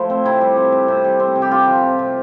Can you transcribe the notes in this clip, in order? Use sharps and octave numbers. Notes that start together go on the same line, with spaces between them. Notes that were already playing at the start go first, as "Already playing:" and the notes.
Already playing: F3 A3 E4
C4
C3 E4
G3
C4
C3
C3
G3
C4
C3
G4
C3 F4
F3
C4
C3